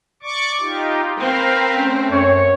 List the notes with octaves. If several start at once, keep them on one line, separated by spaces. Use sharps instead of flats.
D5 C#6 D6
D#4 F4 G4
C4 A#4 B4 F5
A3 C#4
F#2 C#5